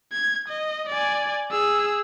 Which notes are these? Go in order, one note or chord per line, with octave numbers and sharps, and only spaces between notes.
G#6
D#5
D5 G#5
G#4 E6